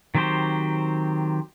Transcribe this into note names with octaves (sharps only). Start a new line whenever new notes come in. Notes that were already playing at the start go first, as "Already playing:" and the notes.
D#3 F#3 C4 G4 C5